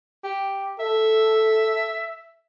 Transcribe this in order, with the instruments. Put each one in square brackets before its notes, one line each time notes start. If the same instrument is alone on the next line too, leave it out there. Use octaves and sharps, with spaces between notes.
[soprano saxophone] G4
[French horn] A4 [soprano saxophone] E5